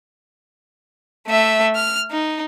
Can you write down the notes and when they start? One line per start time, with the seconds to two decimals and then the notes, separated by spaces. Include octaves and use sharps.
1.28 A3 E5
1.76 F6
2.11 D#4